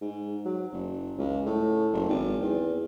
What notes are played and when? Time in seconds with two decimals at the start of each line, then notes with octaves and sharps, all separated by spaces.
0.02 G#2
0.45 F#3
0.73 F#1
1.18 C#2
1.46 A2
1.93 F#1
2.09 G#1
2.42 E2